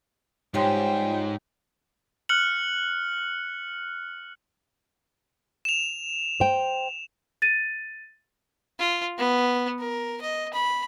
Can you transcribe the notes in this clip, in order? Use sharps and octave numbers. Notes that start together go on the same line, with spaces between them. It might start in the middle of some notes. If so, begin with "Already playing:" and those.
G#2 F3 G3 G4 C#5 G5 C6
F6 F#6 C#7 F#7
E7 F7
C5 G5
A6 D#7
F4
B3
A#4
D#5
B5